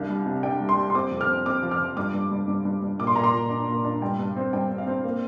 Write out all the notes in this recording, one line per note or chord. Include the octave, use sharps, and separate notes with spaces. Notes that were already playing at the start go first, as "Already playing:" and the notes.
Already playing: C2 D4 F5
G3
C3
D4 G5
G3
C6
G3
C6
C4 D6
F2
F6
C4
C4 D6
F3
F6
F3
G2 D6
G2
G2
G2
G2
G2
A#2 D6
C6
A#2 A#5
C6
A#2
D4
A#2
D4
G2 G5
G2
C4
G2 G5
C4
F5
C4
A#3